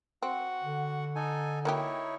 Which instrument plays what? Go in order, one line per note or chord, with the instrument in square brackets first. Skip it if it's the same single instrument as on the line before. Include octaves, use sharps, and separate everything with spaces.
[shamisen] C4 [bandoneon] F#4 F#5
[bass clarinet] D3
[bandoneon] D#4 A4 G#5
[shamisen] A#3 F#4 G4 [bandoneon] D#4 E4 C#5